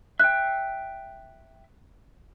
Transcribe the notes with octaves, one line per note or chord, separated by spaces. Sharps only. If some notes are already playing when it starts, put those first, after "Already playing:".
E5 G5 F#6